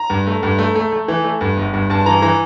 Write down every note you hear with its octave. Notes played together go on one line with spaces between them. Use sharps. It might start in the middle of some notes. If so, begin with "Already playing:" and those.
Already playing: A#5
G2
A3
G2
A3
A3
A3
E3
A3
G2
G1
G2
G2 A5
A5
E3 A#5
E3 A#5